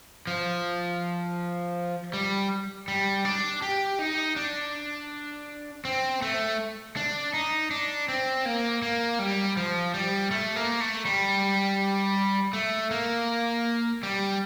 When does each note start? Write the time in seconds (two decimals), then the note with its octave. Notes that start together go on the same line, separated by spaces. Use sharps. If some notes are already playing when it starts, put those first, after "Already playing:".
0.27 F3
2.13 G3
2.88 G3
3.25 D4
3.62 G4
3.99 D#4
4.36 D4
5.85 C4
6.22 A3
6.97 D4
7.34 D#4
7.71 D4
8.08 C4
8.45 A#3
8.82 A#3
9.19 G3
9.57 F3
9.94 G3
10.31 A3
10.56 A#3
10.80 A3
11.05 G3
12.53 A3
12.91 A#3
14.03 G3